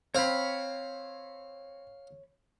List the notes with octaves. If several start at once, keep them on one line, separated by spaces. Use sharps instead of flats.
C4 C#5 F5 A#5 B5